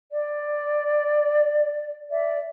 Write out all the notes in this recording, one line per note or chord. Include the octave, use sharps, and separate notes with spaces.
D5
D5 E5